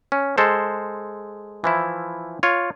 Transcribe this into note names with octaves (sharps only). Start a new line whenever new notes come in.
C#4
G#3 A4 C5
E3 F3 E4
F4 C#5